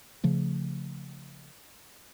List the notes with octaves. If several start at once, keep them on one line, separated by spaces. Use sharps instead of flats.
C#3 F3 A3